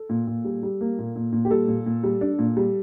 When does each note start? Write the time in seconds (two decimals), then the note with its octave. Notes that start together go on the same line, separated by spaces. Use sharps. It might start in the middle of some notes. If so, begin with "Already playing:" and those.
Already playing: A4
0.09 A#2
0.27 A#2
0.44 G3
0.63 G3
0.81 A#3
0.98 A#2
1.16 A#2
1.32 A#2
1.45 G4
1.50 G3 A4
1.68 A#2
1.86 A#2
2.03 G3
2.21 D4
2.39 A#2
2.57 G3